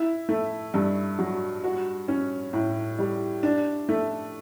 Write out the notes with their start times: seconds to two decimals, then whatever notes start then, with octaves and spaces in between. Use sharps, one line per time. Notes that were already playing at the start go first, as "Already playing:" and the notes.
Already playing: E4
0.29 A3
0.74 G2
1.19 F#3
1.64 F#4
2.08 C#4
2.53 A2
2.99 G3
3.43 D4
3.89 A3